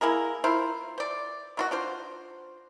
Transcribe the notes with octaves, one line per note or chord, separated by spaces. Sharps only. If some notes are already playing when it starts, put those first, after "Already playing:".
A#3 E4 G#4 A#4
E4 F4 A#4 C5
C5 D5
D#3 F4 F#4
D4 F4 C5